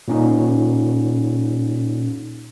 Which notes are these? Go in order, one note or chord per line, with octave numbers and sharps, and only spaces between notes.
A#2 C#4 D#4